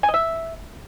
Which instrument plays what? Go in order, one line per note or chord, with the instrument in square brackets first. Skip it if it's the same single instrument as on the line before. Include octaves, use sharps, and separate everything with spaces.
[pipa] G#5
D#5
E5